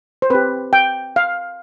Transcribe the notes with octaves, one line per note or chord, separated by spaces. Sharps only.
C5
C4 G4 B4
G5
F5